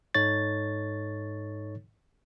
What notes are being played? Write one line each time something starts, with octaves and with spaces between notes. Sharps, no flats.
G#2 D#4 A4 C#5 A6